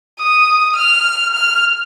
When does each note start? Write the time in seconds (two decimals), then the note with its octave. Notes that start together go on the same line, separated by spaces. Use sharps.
0.19 D#6
0.76 F6
1.34 F6